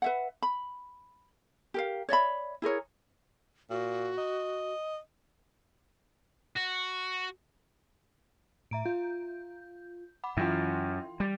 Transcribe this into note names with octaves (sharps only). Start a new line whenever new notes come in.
B4 E5 F#5
B5
G4 A#4 F5
C#5 D5 E5 B5
E4 G#4 A#4 C#5
A#2 F#4
D#5
F#4
A2 E5 A#5 D7
F4 G6
F#5 B5 D6
F#2 E3 E4 F4 G5 C6
G3